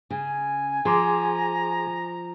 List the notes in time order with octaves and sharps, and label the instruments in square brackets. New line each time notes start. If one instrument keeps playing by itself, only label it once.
[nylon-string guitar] C#3 [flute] G#5
[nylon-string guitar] F3 [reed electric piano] G#4 C6 D6 [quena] A#5